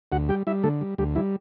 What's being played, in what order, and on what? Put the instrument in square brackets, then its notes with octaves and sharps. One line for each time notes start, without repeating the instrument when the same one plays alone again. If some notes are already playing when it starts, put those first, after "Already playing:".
[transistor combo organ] D2 F#4 F#5
G3 G4 G5
G3 E4 E5
D3 A3 A4
G3
D2 G3 G4
E3 G3 E4